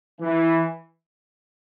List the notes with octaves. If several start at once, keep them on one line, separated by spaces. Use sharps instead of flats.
E3